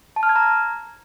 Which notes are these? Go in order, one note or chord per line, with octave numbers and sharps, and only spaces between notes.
A5
F6
G#6
A#5